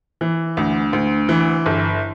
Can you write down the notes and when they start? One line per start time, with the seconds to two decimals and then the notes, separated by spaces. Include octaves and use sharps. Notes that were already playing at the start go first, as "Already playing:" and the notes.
0.21 E3
0.57 D2
0.93 D2
1.29 E3
1.66 G1